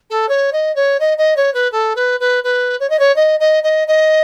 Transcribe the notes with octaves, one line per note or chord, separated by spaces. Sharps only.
A4
C#5
D#5
C#5
D#5
D#5
C#5
B4
A4
B4
B4
B4
C#5
D#5
C#5
D#5
D#5
D#5
D#5